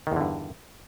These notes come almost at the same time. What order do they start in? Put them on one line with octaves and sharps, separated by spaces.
D#3 E2 D3 G2